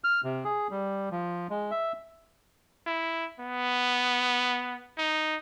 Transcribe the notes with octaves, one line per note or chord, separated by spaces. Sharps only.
F6
C3
G#4
G3
F3
G#3
E5
E4
B3
D#4